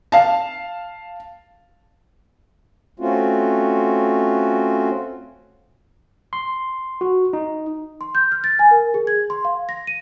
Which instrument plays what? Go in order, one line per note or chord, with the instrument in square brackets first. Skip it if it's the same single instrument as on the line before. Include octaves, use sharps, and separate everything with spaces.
[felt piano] F5 A5
[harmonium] A3 C4 C#4 F4 F#4
[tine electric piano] C6
F#4
D#4
[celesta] C6
G6
F6
A6
G#5
A#4
G#4
G#6
C6
F5
A#6
D#7